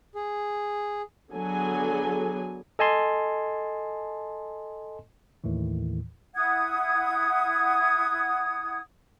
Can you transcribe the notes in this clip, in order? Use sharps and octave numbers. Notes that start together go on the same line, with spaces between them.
G#4
D3 F#3 B3 G#4 A4 G#5
A4 D#5 G#5 A5 C6
D#2 A2 D#3 E3
E4 F#5 D#6 G#6